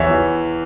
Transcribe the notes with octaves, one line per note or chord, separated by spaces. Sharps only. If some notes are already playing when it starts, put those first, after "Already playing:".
Already playing: E2 C#5 E5
E3